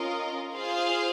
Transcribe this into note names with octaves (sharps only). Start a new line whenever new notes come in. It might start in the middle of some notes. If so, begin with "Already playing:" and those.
Already playing: C#4 F4 A#4 D#5
F4 G#4 C5 F5